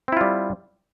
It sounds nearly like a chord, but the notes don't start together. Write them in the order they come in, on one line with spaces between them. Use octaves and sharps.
C4 E4 F4 G3